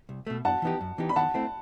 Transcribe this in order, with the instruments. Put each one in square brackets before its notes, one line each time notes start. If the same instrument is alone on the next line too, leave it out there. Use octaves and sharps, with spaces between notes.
[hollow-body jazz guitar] C2
B2 A3
[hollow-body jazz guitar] F#2 [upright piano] F#5 A5
[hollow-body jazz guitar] E3 B3 D#4 G4
F#2
E3 B3 D#4 G4
[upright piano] B5
[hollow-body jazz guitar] D#3 [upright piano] F#5 A5
[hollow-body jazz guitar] A3 C4 E4